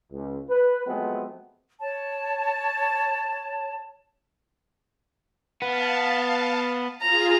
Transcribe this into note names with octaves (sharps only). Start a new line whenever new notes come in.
C#2
B4
F3 F#3 G#3 A3 B3 C4
C#5 A5
B3 F5 A5
F4 G#4 A#5